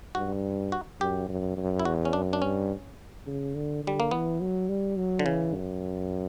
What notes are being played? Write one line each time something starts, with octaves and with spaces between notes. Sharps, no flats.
G2 F#4
F#4
F#2 G4
F#2
F#2
E4
E2 F#4
C#4
F#2 D4
D4
G2 C#4
C#3
D3
D3 G3
A#3
E3 B3
F#3
G3
F#3
D3
C#3 E3
F#2